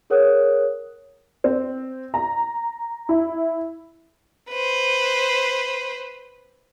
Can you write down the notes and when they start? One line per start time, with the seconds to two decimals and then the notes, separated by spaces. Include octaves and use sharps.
0.10 G#4 A#4 C#5 F#5 D#6 F#6
1.44 C4
2.14 A#5
3.09 E4
4.50 B4 C5